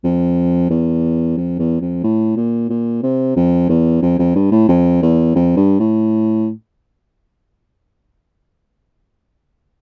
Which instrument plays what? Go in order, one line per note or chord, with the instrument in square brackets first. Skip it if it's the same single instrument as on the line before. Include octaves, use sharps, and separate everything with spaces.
[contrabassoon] F2
E2
F2
E2
F2
A2
A#2
A#2
C3
F2
E2
F2
F2
G2
A2
F2
E2
F2
G2
A2